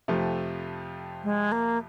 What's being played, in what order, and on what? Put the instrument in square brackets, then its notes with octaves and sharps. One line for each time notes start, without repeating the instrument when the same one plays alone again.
[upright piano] F2 C3 F3 A3
[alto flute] G#3
A#3